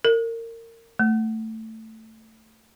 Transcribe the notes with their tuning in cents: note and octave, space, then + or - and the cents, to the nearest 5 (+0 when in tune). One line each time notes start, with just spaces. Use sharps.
A#4 -25
A3 +15